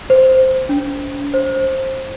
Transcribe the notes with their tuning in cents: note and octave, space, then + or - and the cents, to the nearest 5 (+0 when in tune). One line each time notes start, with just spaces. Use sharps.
C5 -5
D4 -45
C5 +15